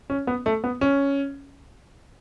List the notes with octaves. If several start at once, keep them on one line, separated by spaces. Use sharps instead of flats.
C#4
B3
A3
B3
C#4